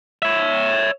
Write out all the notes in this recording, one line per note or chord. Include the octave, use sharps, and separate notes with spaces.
C#5 E5